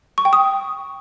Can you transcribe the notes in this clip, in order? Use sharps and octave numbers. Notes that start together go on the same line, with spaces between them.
C#6
G5
D#6